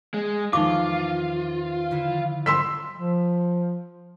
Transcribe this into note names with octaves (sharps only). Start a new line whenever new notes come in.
G#3
E2 D#3 F3 D#4 F4 C#6 D6
D3 E4
G3 C4 E4 C6 E6 B6
F3